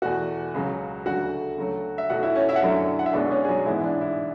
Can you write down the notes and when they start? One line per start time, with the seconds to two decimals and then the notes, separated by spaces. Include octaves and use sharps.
0.02 E2 B2 A3 F#4 F#5
0.54 C#2 C#3 F#3
1.06 D2 C#3 F#3 A3 F#4 F#5
1.58 D2 C#3 F#3 A3
1.98 E5
2.10 B1 B2 A3 F#4 F#5
2.23 E4 E5
2.35 C#4 C#5
2.49 E4 E5
2.56 F#5
2.61 F#2 D3 F#3 A3 E4 E5
2.99 F#5
3.06 E5
3.13 B1 B2 G#3 B3 D4 D5
3.31 C#4 C#5
3.45 G#4
3.48 F#3 F#4
3.66 A1 G#2 E3 G#3 B3 E4
3.84 D4
4.01 E4